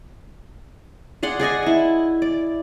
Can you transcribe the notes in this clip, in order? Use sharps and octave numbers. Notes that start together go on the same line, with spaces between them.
G#4 D5 F#5 C6
G#4 D5 D#5 G#5
E4 D#5
D5